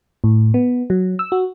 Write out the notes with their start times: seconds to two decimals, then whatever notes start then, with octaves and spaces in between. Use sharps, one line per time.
0.24 A2
0.54 B3
0.90 F#3
1.19 E6
1.32 F#4